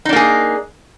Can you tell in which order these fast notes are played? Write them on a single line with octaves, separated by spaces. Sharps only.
D#4 D4 A#3 G#4